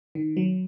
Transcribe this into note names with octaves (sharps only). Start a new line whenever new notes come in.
D#3
F#3